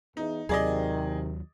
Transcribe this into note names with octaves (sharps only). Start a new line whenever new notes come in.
E2 D#4
D#2 C3 D#3 F#3 G#4 D5 D#5